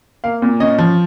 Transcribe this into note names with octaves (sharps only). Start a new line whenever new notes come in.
A#3 F5
A#2
C#4 D#5
F3